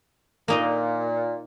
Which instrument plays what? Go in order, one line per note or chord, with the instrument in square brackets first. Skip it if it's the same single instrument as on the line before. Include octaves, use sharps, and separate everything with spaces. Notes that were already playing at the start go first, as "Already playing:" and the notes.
[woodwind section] A#2 [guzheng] A#3 D#4 D#5